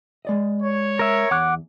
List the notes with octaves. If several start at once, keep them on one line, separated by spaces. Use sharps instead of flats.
G#3 D5 D#5
C#5
A#4 E5
E2 F#5 D6 F#6